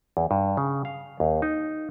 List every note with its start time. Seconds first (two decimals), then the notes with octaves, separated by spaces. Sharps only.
0.17 E2
0.31 G2
0.57 C#3
0.85 F5
1.20 D#2
1.42 D#4